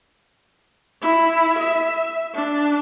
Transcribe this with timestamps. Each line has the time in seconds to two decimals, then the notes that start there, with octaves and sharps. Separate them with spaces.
1.02 E4
1.60 E5
2.35 D4